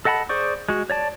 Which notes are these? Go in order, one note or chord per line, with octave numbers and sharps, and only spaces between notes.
A4 D#5 F#5 A5 B5
G#4 C5 D5 C#6
G#3 F#4
C#5 D5 A5